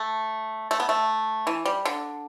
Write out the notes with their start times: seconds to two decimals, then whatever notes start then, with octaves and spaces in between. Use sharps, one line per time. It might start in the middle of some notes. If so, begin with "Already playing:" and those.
Already playing: A3
0.71 A3
0.80 B3
0.89 A3
1.47 E3
1.65 G3
1.85 D3